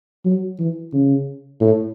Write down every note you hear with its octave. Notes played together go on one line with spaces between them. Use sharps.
F#3
E3
C#3
A2